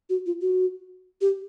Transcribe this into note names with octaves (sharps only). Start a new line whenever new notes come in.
F#4
F4
F#4
G4